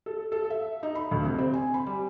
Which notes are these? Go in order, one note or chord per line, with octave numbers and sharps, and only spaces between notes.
A4
A4
E5
D#4
B5
D2
C3
C4
G#5
B5
G3